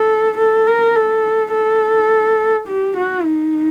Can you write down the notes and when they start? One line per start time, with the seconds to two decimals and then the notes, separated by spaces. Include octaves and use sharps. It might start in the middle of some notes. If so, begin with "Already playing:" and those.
Already playing: A4
0.38 A4
0.67 A#4
0.96 A4
1.53 A4
2.68 G4
2.97 F#4
3.25 D#4